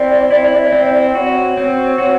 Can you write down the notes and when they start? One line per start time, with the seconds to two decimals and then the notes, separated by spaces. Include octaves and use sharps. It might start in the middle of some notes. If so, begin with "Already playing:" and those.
Already playing: C4 E4 D5
0.31 E4
0.72 C4
1.15 F#4 C#5 D5
1.57 C4
1.98 F#4